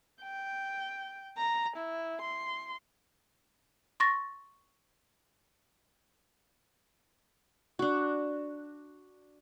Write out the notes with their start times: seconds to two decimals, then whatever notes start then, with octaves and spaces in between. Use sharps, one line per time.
0.22 G5
1.38 A#5
1.76 E4
2.22 C6
4.00 C6 C#6 A6 A#6
7.79 D4 F#4